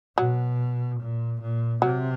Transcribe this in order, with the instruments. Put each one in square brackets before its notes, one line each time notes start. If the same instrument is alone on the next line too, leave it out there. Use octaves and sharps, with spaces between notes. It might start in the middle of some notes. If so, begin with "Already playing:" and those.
[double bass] B2 [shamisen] F#3
[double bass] A#2
A#2
[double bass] C3 [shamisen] F#3